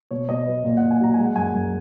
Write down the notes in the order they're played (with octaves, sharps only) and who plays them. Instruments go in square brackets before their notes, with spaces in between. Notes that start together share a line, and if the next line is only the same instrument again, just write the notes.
[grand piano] B2 C#5
B2 D#5
F#3 B4
A#2
F#5
A#2
G#5
F#3 A#5
G#3 G#5
F#5
F#2 G#5
F#2